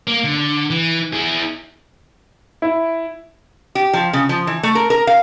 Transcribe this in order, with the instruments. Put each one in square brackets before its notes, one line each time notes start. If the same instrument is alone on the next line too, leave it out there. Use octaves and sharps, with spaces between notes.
[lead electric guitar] A#3
D3
E3
E4 G#4
[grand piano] E4
[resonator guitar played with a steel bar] G4
F3
C#3
F3
E3
A3
A#4
A#4
F5